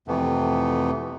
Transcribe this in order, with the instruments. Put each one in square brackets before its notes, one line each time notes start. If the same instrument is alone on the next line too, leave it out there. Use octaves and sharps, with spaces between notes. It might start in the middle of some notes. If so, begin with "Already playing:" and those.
[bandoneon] F2 C3 E3 A3 B3